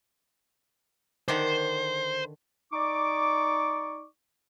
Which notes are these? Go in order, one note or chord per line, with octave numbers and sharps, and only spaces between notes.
D3 D#3 D4 C5
D#4 D5 C#6 D6